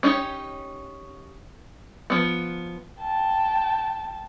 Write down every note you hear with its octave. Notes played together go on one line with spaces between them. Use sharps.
C#4 D#4 F4 G4 C#5
F3 B3
G5 A5